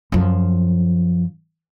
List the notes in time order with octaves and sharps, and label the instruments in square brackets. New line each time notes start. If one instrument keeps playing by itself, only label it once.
[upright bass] F#2 F3